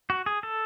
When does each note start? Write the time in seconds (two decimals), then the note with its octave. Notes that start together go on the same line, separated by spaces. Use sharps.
0.10 F#4
0.26 G#4
0.43 A4